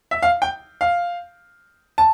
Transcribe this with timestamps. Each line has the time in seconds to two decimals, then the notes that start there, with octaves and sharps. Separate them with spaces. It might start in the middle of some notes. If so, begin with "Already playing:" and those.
0.11 E5
0.22 F5
0.42 G5
0.81 F5
1.98 A5